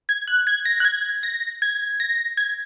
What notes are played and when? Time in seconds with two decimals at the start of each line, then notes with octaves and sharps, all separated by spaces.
0.09 G#6
0.27 F#6
0.47 G#6
0.65 A#6
0.80 F#6
0.85 G#6
1.23 A#6
1.62 G#6
2.00 A#6
2.37 G#6